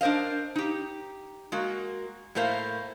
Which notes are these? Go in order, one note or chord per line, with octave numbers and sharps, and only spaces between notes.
D4 A#4 C5 D#5 F5
D#4 G4
G#3 A#3 F#4
A2 A3 A#3 C5 F5